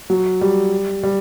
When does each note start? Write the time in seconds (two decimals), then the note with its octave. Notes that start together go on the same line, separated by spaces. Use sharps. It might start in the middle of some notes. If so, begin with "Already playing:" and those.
0.10 F#3
0.41 G3
1.03 G3